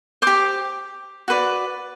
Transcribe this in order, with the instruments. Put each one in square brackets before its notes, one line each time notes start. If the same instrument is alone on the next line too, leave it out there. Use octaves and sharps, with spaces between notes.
[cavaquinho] G4 C5 D6
F#4 B4 D5